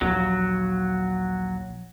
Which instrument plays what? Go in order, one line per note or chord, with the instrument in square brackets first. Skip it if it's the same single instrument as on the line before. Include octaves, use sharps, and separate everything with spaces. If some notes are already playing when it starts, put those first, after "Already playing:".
[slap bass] A#1 D#2 [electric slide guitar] F#3